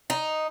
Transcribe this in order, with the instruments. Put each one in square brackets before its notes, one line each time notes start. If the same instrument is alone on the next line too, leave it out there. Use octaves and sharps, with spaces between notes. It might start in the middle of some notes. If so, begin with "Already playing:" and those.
[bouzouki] D#4